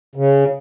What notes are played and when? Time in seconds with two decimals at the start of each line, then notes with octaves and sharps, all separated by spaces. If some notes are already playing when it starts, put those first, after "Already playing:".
0.15 C#3